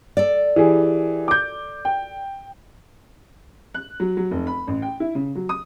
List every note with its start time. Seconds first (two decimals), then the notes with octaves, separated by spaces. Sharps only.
0.17 A4 D5
0.56 E3 G4 G#4
1.28 D6 G6
1.85 G5
3.74 F#6
4.00 F#3
4.17 F#3
4.31 F1
4.47 B5
4.67 A1
4.82 G5
5.00 E4
5.15 C#3
5.35 F#3
5.49 D#6